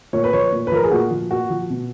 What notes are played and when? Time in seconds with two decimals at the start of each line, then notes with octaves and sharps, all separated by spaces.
0.13 A#2 C#5
0.24 B4
0.33 F3 C#5
0.53 A#2
0.67 B4
0.72 F3 A#4
0.83 G#4
0.91 A#2 F#4
1.11 F3
1.30 A#2 F#4
1.50 F3
1.70 B2